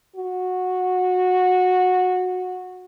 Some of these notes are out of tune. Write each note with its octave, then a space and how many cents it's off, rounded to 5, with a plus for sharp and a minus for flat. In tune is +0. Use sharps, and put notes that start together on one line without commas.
F#4 -15